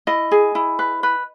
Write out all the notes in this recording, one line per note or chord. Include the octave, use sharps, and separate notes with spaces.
E4 D#5
G#4
E4
B4
B4